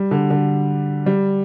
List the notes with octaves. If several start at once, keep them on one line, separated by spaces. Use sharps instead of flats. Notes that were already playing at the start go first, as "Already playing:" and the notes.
Already playing: G3
D3
D3
G3